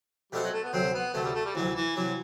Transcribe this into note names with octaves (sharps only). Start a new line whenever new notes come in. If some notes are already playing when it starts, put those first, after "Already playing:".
B2 G3 A3 C4 F#4
F#3
A3
B3
D2 C3 F#3 C4
B3
D2 C3 F#3 A3
G3
A3
G3
D2 C3 E3 F#3
E3
C3 E3 F#3